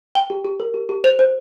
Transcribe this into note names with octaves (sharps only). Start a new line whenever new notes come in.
G5 G7
G4
G4
A#4
G4
G4
C5 F7
C5